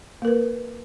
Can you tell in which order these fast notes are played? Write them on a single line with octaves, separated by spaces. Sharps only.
A#3 A#4 B4